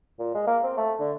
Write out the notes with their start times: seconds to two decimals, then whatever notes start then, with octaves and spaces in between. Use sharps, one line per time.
0.19 A#2
0.35 G#3
0.47 A#3
0.63 C4
0.77 A3
1.00 D3